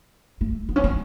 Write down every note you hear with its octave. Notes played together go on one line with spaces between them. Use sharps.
A3
B3
C#4
B3